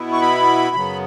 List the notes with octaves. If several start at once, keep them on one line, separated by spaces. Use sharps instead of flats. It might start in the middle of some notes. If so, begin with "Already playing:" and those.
Already playing: B2 B3 E4
C#6
B5
F#2 C#3 F#3 B3